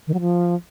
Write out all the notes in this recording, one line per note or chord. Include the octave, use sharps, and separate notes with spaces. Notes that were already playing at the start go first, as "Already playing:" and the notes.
D#3
F#3
F3